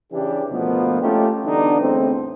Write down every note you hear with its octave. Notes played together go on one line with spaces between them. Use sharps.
C#3 E3 D4 G4
D2 B2 F3 A#3 B3
A3 C#4 D#4 F4 G4
D3 E3 G3 B3 D4 D#4
E2 A2 D3 C4